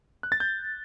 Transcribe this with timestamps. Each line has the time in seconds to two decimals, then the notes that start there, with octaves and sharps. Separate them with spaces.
0.23 F#6
0.32 A6
0.40 G6